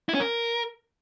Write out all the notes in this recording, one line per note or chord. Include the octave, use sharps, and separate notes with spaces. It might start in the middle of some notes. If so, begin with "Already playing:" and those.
E4
C#4
A#4